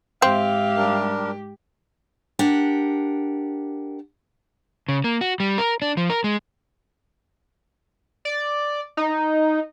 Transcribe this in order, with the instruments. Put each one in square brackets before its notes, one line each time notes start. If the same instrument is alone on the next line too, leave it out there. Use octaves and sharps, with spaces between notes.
[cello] G#2 G4 [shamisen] C4 [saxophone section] E5 F5
[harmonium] G3 D4 A#4
[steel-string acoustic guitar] D4 G4 A#4 F#5
[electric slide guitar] C#3
A#3
F#4
G3
A#4
D4
F3
A#4
G#3
[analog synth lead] D5
D#4